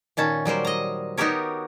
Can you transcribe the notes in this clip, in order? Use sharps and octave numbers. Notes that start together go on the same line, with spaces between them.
A#2 D#3 C#4 A5
F#3 G3 A#4 C5
D#5 A#5
B3 D#4 F#4 G4 A#4 C#5